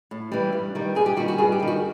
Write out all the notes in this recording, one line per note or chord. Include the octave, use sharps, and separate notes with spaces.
A2
E3 G3
G2
D#3 G3
G2 G#4
G4
D#3 G3 F#4
F#4
G2 G#4
G4
D#3 G3
F#4